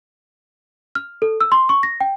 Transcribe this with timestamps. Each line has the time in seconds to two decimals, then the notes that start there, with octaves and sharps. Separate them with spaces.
0.95 F6
1.22 A4
1.41 E6
1.52 C6
1.69 C#6
1.83 A#6
2.01 G5